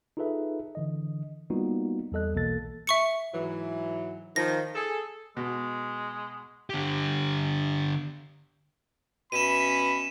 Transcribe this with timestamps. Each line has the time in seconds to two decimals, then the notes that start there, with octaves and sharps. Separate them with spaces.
0.17 D#4 F4 G#4 A4 B4 E5
0.75 D3 E3 D#5
1.50 G3 A#3 B3 D#4 F4 F#4
2.12 E2 G3 A4 D#5 F#6
2.34 B1 B2 E3 A#3 A4 A6
2.87 E5 C#6 C#7
3.34 G#2 E3 F#3
4.36 D#3 F3 A#6
4.75 G#4 A4
5.37 B2 G#3
6.70 D3 G4
9.32 B2 C#4 E5 B5 D#7 E7